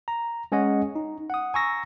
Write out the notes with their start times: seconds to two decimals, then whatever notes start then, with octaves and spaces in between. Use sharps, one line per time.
0.08 A#5
0.52 G#3 C#4 G#4 C#5 D#5 F#5
0.96 D#4
1.30 F#5 D#6
1.54 G#5 A#5 C#6 E6 A#6